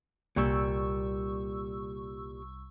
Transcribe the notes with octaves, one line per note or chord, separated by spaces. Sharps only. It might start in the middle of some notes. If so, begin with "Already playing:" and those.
C2 A#2 G3 C#6 E6